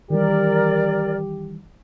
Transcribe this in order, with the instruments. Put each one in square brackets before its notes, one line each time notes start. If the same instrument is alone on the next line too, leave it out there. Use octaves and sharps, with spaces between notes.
[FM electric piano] D#3 E3 G3 [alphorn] G4 [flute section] A#4 D5